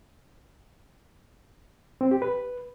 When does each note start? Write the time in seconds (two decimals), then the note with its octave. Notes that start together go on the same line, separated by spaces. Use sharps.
2.01 C4
2.11 G4
2.22 B4